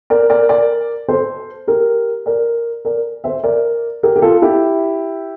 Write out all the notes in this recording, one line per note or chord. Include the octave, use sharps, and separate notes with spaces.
A#4 D5
A#4 D5
A#4 D5
A4 C5
G4 A#4
A#4 D5
A#4 D5
C5 E5
A#4 D5
G4 A#4
G4
F4 A4
E4 G4